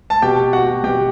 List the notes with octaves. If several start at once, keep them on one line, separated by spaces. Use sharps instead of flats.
A5
B2 G4 G5
F#4 F#5
B2 G4 G5